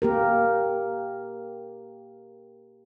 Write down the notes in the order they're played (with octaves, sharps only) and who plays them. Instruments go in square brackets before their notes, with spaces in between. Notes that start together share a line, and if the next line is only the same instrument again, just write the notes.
[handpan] A#3 G4 A#4